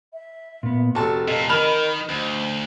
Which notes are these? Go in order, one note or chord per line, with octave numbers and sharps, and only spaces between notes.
E5
A#2 B3
F1 F#4 A4 A5
A#2 D#5
D#3 A#4 B5 F6 F7
D2 C5